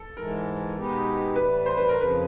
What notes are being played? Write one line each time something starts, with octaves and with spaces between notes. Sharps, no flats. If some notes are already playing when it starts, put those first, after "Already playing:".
Already playing: A4
G#2 E3 G#3 A#4
B2 G#3 B3 D#4 G4
A2 E3 G3 B4
C5
B4
A#4
F2 C#3 F3 B4